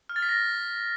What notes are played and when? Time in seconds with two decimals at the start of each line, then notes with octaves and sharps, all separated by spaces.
0.09 F6
0.16 A6
0.22 B6
0.29 A#6